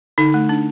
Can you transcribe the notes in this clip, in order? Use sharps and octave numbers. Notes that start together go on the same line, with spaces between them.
D3 D#4
A3
D4